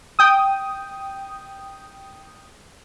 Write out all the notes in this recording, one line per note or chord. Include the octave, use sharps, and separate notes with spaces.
G5 D#6